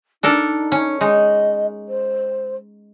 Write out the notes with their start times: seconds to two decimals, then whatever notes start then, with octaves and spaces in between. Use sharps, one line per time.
0.23 D4 D#4 A4 A#4
0.72 C#4
1.01 G#3 D#4 D#5
1.89 C5